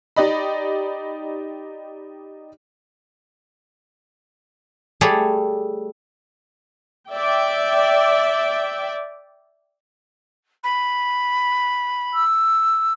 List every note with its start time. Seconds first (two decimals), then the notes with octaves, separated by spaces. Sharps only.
0.16 D#4 G4 D5 D#5 B5
5.01 G3 A3 G#4 C#5 D5
7.13 D5 E5 G5
10.63 B5
12.14 E6